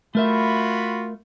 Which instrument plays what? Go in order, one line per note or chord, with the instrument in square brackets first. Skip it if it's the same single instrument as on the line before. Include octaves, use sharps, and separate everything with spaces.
[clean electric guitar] A3 A#4 E5 [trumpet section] F4 F#4 B5